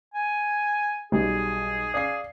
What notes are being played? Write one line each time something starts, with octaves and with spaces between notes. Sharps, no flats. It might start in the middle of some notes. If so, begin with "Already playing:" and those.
G#5
B1 G3 G#4
G#4 D5 F5 C7